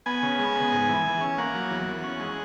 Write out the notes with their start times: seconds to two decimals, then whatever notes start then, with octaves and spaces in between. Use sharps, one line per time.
0.06 B3 G#5
0.23 C#3
0.39 G#3
0.55 B3
0.72 G#2
0.89 E3
1.05 E3
1.21 C#4
1.38 A#3 F#5
1.55 F#3
1.71 E2
1.87 E2
2.04 C#4
2.20 G#3